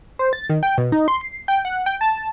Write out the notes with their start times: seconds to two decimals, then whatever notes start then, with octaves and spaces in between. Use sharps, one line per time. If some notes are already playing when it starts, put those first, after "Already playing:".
0.19 C5
0.33 A6
0.50 D#3
0.63 G5
0.78 B2
0.92 D#4
1.08 C6
1.21 C7
1.48 G5
1.65 F#5
1.86 G5
2.01 A5